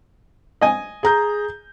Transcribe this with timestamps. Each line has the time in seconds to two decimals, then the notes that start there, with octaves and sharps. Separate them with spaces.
0.61 D#5 G#5
1.03 G#4 A#5 G6